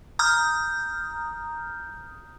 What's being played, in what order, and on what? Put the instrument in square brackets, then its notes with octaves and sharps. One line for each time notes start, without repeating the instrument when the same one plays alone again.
[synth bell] A#5 D#6 F6 G6